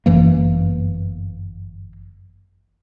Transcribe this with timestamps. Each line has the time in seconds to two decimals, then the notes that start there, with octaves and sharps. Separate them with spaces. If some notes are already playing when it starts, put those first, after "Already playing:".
0.06 G1 F#2 E3 A#3